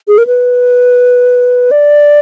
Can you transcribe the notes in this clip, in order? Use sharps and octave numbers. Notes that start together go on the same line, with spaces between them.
G#4
A#4
B4
D5